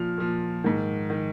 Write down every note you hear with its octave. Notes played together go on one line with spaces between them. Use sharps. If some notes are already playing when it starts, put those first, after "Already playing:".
Already playing: A#2 F3 F6
A#2 F3
G#2 D#3
D#3